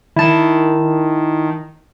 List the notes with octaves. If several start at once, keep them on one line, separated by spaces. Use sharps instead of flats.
D#3 E4 A5